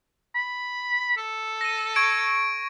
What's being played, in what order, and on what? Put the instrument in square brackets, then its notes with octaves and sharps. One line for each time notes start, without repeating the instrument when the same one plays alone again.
[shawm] B5
A4
[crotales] A#6 D#7
C#6 G#6 D7